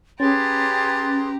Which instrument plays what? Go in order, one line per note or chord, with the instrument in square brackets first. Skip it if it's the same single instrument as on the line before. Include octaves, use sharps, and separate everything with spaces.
[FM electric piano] C#4 [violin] G4 A#5 [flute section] G#4 B4 C6 [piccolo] A6